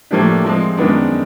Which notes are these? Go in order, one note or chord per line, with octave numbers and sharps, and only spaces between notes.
A2 F3 A#3 D4 G4
F3 G#3 C4
F#2 D#3 G#3 B3 D4